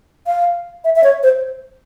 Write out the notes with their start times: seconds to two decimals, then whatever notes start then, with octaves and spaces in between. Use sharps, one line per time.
0.27 F5
0.84 E5
0.96 E5
1.04 C#5
1.23 C5